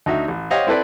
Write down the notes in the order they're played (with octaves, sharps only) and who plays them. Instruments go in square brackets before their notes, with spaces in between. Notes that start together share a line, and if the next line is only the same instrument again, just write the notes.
[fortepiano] D2 D#4 F#4 E5
A1
G4 C5 C#5 D#5 F5 F#5
C4 E4 A4 B4 D5